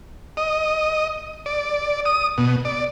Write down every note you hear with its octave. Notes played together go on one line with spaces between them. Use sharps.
D#5
D5
D#6
B2
D5